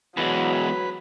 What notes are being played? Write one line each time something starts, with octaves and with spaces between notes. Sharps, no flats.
E2 F#3 G#3 B4